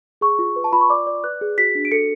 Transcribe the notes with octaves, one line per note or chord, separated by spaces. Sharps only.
G#4 C#6
F4
B4
A5
F4 B5
C#6
D5 D6
D5
B4 F#6
G#4
F#4 B6
D4
D7
A4 C#7